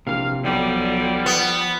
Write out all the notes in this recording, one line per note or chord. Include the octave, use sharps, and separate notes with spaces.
A#1 C3 E3 F5
B1 D3 F3 G3
B3